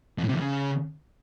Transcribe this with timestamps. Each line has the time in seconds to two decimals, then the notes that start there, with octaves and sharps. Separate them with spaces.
0.18 F2
0.24 A2
0.29 C3
0.34 E2
0.40 C#3